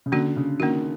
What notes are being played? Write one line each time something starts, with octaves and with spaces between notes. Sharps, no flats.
C#3
D3 A#3 C#4 F#4
C#3
D#3 A#3 C#4 F#4